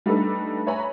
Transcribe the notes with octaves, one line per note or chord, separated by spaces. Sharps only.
G3 A3 D4 D#4 A4 B4
B4 C#5 E5 G#5 A#5 B5